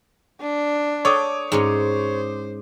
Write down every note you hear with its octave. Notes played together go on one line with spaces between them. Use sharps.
D4
A4 C#5 G5 D6 D#6
G#2 G#3 C#4 C5